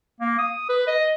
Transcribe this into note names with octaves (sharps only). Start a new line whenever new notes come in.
A#3
D#6
B4
D#5